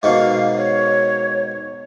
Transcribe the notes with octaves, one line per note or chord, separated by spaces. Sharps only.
G#2 B2 A#3 F5
C#5